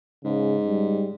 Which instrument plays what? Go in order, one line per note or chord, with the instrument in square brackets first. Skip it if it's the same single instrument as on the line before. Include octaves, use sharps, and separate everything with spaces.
[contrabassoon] G#2 [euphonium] C#3
[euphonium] G3